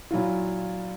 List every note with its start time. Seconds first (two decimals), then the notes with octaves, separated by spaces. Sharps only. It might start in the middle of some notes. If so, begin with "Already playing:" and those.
0.11 A#2 F#3 E4 F4